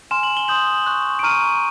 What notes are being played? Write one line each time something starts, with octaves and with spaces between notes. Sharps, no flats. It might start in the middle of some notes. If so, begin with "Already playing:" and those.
G#5 C6 F6 E7
F#7
G7
C6 D#6 G6 F#7
C#6 F#6
D7
A#5 C#6 F6 D#7